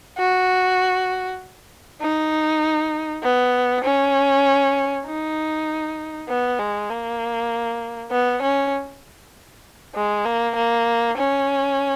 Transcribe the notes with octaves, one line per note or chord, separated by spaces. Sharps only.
F#4
D#4
B3
C#4
D#4
B3
G#3
A#3
B3
C#4
G#3
A#3
A#3
C#4